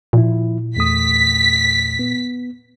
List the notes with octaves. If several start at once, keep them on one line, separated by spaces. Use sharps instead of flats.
A#2 F3 E4
E2 A3 D#6 B6
B3